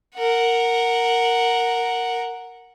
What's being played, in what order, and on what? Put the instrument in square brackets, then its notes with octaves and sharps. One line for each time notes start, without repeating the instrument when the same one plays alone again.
[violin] A#4 F#5